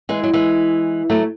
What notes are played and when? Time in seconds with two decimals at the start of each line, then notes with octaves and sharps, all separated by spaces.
0.09 E3 G#3
0.23 F#3
0.34 E3 G#3
1.10 F#3 A3